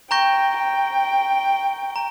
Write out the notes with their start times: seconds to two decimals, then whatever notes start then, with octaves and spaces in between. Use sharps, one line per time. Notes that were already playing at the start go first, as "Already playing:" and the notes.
0.11 G5 A#5 C#6 G6 A#6
0.58 G5
1.96 A#5